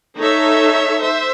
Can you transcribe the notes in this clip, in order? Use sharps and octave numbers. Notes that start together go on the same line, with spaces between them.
D#4 A4 C#5 E5
C5 E5